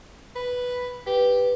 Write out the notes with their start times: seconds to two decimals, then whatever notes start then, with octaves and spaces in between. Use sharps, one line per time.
0.35 B4
1.06 G4 B4